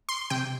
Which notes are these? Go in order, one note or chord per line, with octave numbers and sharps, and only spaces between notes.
C6
C3 G5